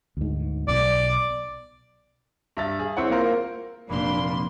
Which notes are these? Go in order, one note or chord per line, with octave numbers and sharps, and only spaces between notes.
D2 G#2
B1 B2 D5
G2 E5 A6
G#4
C4 E4 C#5 F#5
A#3 F4 A#4 C5
F1 A#2 A#3 D4 B5 C6